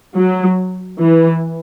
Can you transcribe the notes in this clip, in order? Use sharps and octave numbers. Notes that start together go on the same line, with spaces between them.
F#3
E3